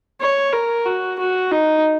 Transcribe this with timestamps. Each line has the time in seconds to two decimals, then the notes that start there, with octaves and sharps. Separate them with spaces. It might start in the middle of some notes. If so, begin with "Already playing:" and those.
0.21 C#5
0.53 A#4
0.85 F#4
1.19 F#4
1.51 D#4